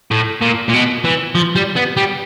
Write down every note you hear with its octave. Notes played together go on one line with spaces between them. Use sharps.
A2
A#2
A#2
B2
E3
F3
G3
B3
G3